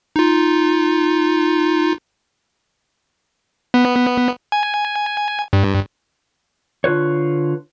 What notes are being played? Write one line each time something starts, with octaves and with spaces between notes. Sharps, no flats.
D#4 F4
B3
G#5
G2
D3 F4 B4 C#5